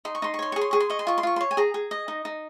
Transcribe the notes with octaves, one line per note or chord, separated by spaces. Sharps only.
D#4 C6
C#6
D#4 C6
C#6
C#5 C6
C#6
G#4
C6
G#4 C#6
C6
D#5 C#6
C6
F4 C#6
C6
F4 C#6
C6
C#5
G#5
G#4 A#5
G#4
D#5
D#4
D#4